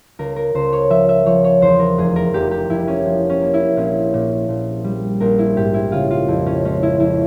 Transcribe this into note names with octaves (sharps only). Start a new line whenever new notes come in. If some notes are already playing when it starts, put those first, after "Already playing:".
C#2 A#4
A#4
C#2 C5
C#5
F3 E5
E5
F3 C#5
C#5
E2 C5
A#4
F1 G#4
A#4
F1 G4
G4
F1 E4
C#4
F3
C#4
A#3
E4
A#1 C#4
A#2
A#1
G3
A#1 A#4
E4
G#2 G4
E4
C#3 F4
F4
F2 E4
C#4
G#3 C#4
E4
F2 E4